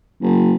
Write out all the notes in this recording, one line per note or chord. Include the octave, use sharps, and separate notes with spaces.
F#1